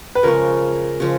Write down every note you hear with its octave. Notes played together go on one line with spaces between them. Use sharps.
B4
C#3 F3 G#3 C#4 A#4
C#3 F3 G#3